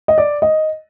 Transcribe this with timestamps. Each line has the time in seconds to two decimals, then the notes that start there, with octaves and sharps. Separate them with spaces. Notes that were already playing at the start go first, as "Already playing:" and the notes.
0.08 D#5
0.18 D5
0.42 D#5